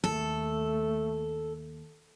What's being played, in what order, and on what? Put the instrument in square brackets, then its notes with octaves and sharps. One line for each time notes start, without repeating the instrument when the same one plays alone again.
[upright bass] D#2 [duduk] A3 [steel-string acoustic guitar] A4